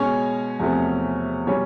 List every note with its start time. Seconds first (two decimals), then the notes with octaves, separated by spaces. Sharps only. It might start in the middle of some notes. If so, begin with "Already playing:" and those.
Already playing: B2 G#3 C#4 C#5
0.60 E2 C3 F3 A3
1.47 B2 G3 C#4 C#5